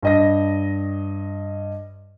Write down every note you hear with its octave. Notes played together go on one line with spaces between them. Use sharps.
G2 D#5 A#6